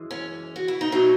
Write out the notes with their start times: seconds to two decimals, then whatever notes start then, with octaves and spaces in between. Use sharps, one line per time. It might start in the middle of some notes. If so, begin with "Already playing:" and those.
Already playing: F#2 E3 G#3
0.11 C#4
0.56 F#4
0.68 E4
0.81 D#4
0.92 B2 F#3 A3 D#4